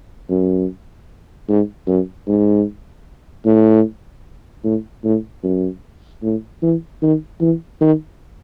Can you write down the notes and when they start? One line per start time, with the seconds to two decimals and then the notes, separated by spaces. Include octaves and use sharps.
0.30 F#2
1.49 G#2
1.88 F#2
2.27 G#2
3.45 A2
4.64 A2
5.04 A2
5.43 F#2
6.23 A2
6.63 E3
7.02 D#3
7.41 E3
7.81 D#3